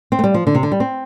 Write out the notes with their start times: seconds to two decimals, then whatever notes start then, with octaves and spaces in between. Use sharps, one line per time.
0.12 C4
0.19 A3
0.24 G3
0.34 F3
0.47 D3
0.55 C3
0.63 D3
0.72 G3
0.80 C4